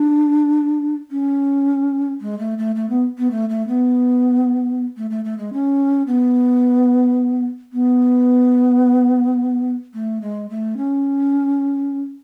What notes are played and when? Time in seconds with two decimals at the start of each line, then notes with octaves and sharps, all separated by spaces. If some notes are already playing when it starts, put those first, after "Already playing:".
Already playing: D4
1.11 C#4
2.21 G#3
2.39 A3
2.58 A3
2.76 A3
2.90 B3
3.18 B3
3.31 A3
3.49 A3
3.68 B3
4.97 A3
5.10 A3
5.25 A3
5.38 G#3
5.53 C#4
6.07 B3
7.73 B3
9.94 A3
10.21 G#3
10.50 A3
10.77 C#4